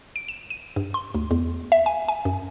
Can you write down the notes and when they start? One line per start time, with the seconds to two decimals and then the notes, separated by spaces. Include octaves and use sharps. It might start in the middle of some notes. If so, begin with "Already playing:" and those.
0.16 D7
0.29 E7
0.50 D#7
0.76 G2
0.94 C6
1.15 D2
1.31 E2
1.72 E5
1.86 G#5
2.08 G#5
2.25 F#2